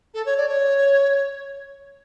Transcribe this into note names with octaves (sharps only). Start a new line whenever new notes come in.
A4
C#5
D5
C#5